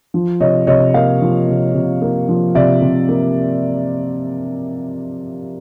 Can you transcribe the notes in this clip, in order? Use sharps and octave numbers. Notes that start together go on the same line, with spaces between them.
F3
C3 C#5 D#5
C3 C#5 D#5
A#3 D#5 F5
F3
C3
C3
A#3
F3
C3 D5 E5
C3
A#3